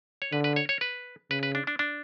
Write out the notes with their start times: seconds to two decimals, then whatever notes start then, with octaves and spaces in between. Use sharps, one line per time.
0.22 C#5
0.32 D3 B4
0.44 B4
0.56 C#5
0.69 C#5
0.81 B4
1.31 C#3 B4
1.43 B4
1.55 D4
1.67 D4
1.79 D4